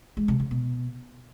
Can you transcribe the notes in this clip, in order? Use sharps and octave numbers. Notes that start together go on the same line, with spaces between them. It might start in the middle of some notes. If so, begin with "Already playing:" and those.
G#3
C3
C#3
B2